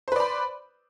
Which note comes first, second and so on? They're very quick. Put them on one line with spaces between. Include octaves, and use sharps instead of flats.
C5 B4 D5 B5